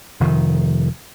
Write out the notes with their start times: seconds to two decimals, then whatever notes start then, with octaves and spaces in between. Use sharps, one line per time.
0.20 F1 D#3